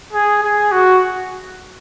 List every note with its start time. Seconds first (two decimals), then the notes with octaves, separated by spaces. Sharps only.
0.13 G#4
0.42 G#4
0.72 F#4